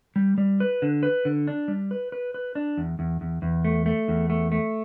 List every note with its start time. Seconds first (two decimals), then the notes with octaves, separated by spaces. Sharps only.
0.16 G3
0.38 G3
0.60 B4
0.82 D3
1.03 B4
1.25 D3
1.47 D4
1.68 G3
1.91 B4
2.12 B4
2.34 B4
2.55 D4
2.77 E2
2.99 E2
3.21 E2
3.42 E2
3.65 A3
3.86 A3
4.08 E2
4.30 A3
4.52 A3